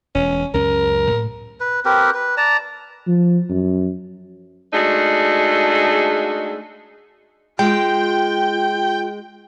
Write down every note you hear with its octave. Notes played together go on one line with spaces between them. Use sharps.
E1 C#4
C#2 F#2 C#4 A#4
A2
B4
C4 G4 A#4 B4
B4
D5 A5 A#5
F3
F#2
G#3 A3 D4 D#4 F#4 G#4
G#3 F4 G5